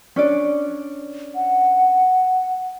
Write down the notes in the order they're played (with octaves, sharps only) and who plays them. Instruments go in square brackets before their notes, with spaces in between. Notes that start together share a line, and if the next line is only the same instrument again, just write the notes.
[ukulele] C#4 D4 D5
[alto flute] F#5